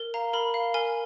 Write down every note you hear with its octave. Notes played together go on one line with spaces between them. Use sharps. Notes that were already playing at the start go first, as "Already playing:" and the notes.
Already playing: A#4
F5 A#5
A#4 B5
F5
A#4 G#5